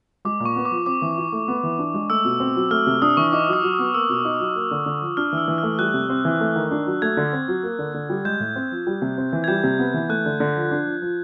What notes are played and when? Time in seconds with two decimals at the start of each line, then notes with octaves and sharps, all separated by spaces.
0.25 G#3 D6
0.40 A#2
0.45 C#6
0.56 B3
0.65 D6
0.71 F3
0.86 C4 D6
1.02 E3
1.18 E4
1.32 A3
1.48 B3
1.63 E3
1.78 D4
1.94 G#3
2.10 A3 E6
2.25 B2
2.40 C4
2.56 F#3
2.71 A3 F6
2.87 C3
3.02 D4 D#6
3.17 E3 C#6
3.33 D#4 D6
3.48 F#3 D#6
3.63 F#3
3.74 D#6
3.79 B3
3.94 A#3 E6
4.09 B2
4.25 D#4
4.40 F#3
4.55 A#3
4.71 D3
4.86 D3
5.02 F3
5.17 D4 F6
5.33 E3 E6
5.48 E3
5.58 F6
5.63 A3
5.79 G3 F#6
5.94 C3
6.09 C4
6.25 E3
6.40 A3
6.56 D#3
6.71 D4
6.87 F#3
7.02 A3 G#6
7.17 D3
7.33 C4
7.48 F#3
7.63 A#3
7.79 D3
7.94 D3
8.10 G3
8.25 G#3 G6
8.40 A2
8.56 C4
8.72 F3
8.87 G3
9.02 C3
9.18 C4
9.33 E3
9.44 G#6
9.48 G3 G6
9.64 C3
9.79 B3
9.94 E3
10.09 A3 F#6
10.26 D3
10.40 D3
10.56 F3
10.71 D4
10.86 F3
11.02 F3